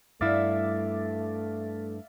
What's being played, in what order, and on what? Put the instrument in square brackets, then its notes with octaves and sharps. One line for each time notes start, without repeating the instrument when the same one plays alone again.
[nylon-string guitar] G2 E4 [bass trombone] A3 [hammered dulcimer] D5 E5 F5